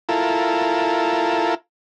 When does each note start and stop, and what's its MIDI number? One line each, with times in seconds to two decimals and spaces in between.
0.09 1.54 64
0.09 1.54 65
0.09 1.54 69
0.09 1.54 70